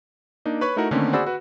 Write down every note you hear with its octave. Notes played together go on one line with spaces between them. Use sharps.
A#3 D4 D#4
B4 C#5 B5 C#6
A3 D#4 E4 F#4 A#4 F#5
D3 D#3 A3 A#3 C4 C#4
F#4 G#4 C5 D5 B5 E6
F#4 B4